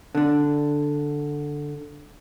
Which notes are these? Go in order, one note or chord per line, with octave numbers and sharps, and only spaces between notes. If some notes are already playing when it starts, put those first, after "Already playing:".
D3 D4